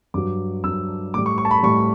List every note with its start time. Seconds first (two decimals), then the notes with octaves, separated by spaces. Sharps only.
0.14 G2 F#3 D6
0.64 G2 F#3 E6
1.14 A2 G3 D6
1.26 C#6
1.38 C#6
1.45 A5
1.51 B5
1.63 A2 G3 C#6